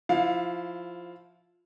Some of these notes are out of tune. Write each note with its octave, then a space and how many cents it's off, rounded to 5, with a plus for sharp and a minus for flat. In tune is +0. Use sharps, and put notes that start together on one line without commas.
F3 +0 E4 +10 F5 +25